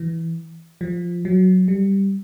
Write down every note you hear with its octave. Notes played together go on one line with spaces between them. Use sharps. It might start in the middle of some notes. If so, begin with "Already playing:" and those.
Already playing: E3
F3
F#3
G3